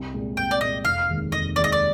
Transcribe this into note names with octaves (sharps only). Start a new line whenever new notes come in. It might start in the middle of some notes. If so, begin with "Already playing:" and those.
Already playing: C2
A#2 G#3
C2 G5
D5
A#2 G#3 D#5
F1 F5
D#2 D#3 G#3
F1 D#5
D#2 D#3 G#3 D5
D#5
D5